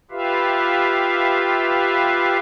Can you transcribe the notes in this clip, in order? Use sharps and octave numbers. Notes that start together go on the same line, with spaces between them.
F4 G4 B4 E5 F5